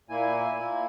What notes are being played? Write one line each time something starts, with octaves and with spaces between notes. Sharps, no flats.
A#2 A#3 E4 G#5
A#2 A#3 E4